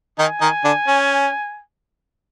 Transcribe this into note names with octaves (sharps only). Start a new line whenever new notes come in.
D#3 D#4 G#5
D#3 D#4
D3 D4
C#4